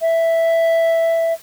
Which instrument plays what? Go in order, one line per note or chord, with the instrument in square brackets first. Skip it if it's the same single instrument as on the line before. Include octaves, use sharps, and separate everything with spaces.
[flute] E5